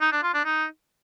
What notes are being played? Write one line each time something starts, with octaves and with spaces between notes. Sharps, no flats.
D#4
D4
F4
D4
D#4